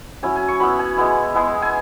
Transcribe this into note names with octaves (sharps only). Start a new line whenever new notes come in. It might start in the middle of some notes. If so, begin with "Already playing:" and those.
F#3 C#4 E4 G#5
G#5
C#6
F#3 B3 E4 B5
G#5
G#3 B3 E4
G#3 B3 E4
G#5